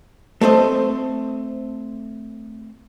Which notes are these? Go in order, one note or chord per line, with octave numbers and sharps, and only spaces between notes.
A3 C4 C5 D#5